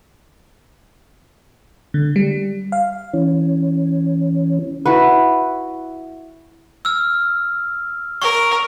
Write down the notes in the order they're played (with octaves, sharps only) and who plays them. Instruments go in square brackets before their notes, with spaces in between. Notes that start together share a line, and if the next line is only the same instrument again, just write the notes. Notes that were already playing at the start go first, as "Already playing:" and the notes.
[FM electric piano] D3
G3
F5
[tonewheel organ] E3 C#4
[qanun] E4 F#4 B4
[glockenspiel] E6 F6
[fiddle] A#4 [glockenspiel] C#6